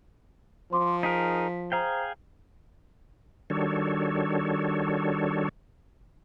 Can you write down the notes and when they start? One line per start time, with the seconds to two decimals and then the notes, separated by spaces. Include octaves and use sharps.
0.71 F3 C5 C6 D6
1.03 D#4 G#4 A#4 B6
1.72 G#4 C5 F5 G5 A#5
3.50 D#3 G3 D4 F#4 A4 C#5